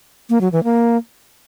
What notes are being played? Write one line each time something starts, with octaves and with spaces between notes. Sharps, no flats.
A#3
F#3
E3
A#3